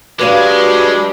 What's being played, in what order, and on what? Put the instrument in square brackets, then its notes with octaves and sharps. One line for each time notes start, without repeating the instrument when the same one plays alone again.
[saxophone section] G2 D5 [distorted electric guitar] G#3 [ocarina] F#4 [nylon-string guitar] B4 C#5 F5